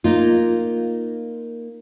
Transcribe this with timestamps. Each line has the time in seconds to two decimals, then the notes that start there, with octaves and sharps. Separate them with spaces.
0.04 A#3 D#4 F4